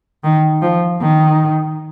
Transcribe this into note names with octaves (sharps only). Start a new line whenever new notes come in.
D#3
F3
D#3